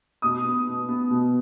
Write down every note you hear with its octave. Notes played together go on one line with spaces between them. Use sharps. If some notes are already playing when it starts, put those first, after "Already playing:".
B2 D#6
B3
B2
B3
B2